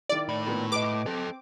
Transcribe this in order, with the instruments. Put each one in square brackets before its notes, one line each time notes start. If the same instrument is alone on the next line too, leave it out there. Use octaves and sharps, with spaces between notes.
[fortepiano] D#3 E4 [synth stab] D5
[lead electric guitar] A2 B5
[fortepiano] A#2 D#3 B3
[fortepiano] B4 D#5 [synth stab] D6
[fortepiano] C4 [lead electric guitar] A4 D#5